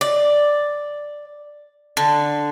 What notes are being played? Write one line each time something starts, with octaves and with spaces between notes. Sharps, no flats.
D5
D3